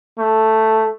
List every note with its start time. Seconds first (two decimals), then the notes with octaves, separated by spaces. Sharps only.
0.19 A3